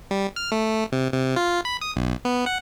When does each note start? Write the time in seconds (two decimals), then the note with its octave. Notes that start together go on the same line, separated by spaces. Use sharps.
0.11 G3
0.36 F6
0.52 A3
0.92 C3
1.12 C3
1.36 F4
1.65 B5
1.81 D#6
1.96 B1
2.25 B3
2.46 F#5